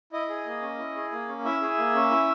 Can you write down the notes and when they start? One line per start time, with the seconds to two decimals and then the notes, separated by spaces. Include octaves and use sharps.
0.13 E4 D#5
0.29 G#4
0.46 A#3
0.62 C#4
0.79 E4
0.95 G#4
1.12 A#3
1.28 C#4
1.45 E4 E5
1.61 G#4
1.78 A#3
1.94 C#4
2.11 E4